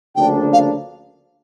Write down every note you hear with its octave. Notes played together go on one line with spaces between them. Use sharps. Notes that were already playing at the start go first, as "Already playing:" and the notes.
D2 C#3 F3 A#3 D4 G5
F5